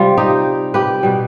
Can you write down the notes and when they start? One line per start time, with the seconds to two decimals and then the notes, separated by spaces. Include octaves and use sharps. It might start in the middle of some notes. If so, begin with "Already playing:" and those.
Already playing: C3 G3 F4
0.17 D#4 G4
0.74 G4 B4
1.03 B2 G3